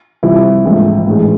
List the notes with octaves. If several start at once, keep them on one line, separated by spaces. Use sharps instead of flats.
C2 C3 F3 E4
A#1 G#2 E3 A3
A1 A2 E3 G#3